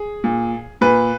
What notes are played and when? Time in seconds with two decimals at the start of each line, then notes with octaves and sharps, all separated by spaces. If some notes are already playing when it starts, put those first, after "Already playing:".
Already playing: G#4
0.24 A#2
0.81 A#2 B4